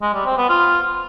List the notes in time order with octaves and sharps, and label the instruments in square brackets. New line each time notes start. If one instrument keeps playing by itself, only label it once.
[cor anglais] G#3
G3
C4
B3
F4